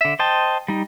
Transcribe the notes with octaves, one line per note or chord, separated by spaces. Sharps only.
D3 E5
C5 D#5 G5 A5
G3 D#4